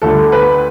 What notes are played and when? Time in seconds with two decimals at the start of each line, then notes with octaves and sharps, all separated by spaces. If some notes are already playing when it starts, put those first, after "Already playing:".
0.02 D2 D3 G3 A4
0.32 B4